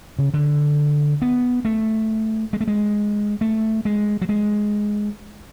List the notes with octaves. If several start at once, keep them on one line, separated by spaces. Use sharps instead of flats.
C#3
D3
B3
A3
G#3
A3
G#3
A3
G#3
F#3
G#3